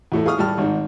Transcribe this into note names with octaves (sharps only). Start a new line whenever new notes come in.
E2 A2 A3
G#4 F5 C#6 D#6 F6
A2 G3 G4 A5 F6
G#1 D#4